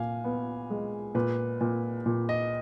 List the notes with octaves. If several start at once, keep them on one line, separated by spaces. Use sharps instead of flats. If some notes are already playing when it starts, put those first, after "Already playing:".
Already playing: A#2 F5 G#5
B3
G#3
A#2 B4
A#2
A#2
D#5